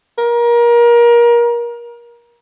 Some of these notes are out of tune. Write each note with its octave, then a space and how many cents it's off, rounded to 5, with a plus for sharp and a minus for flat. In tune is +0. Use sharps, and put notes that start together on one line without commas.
A#4 +25